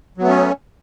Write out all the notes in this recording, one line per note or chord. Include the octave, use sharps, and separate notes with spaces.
F#3 A3 B3 C#4